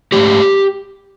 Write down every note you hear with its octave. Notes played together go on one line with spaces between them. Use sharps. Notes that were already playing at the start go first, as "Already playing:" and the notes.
G#2 F3 A3 G4